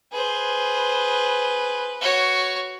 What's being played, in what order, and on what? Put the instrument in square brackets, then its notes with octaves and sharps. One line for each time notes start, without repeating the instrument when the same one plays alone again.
[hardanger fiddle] G#4 C5 [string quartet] B4
[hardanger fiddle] F#4 C#5